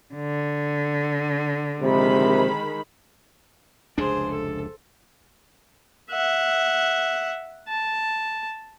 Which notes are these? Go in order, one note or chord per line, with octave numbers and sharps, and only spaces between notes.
D3
A#1 C3 D#3 G#3 B5
F1 C#2 D4 G#4 C5
A4
E5 F#5
A5